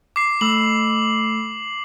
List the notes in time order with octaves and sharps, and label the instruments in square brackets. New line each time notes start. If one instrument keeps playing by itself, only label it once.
[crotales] D6 C7
[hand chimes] A3 B5 E6 [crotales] F#7